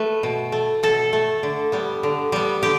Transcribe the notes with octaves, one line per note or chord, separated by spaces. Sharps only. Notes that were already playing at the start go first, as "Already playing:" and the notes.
Already playing: A3 B4
B2
A3
B2 A4
A3
D3
G3 B3
D3
G3 B3
D3 G4